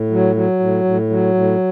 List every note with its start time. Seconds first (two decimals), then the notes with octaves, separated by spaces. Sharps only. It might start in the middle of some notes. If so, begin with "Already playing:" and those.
Already playing: A2
0.10 F#3
0.35 F#3
0.60 A2
0.84 A2
1.10 F#3
1.34 A2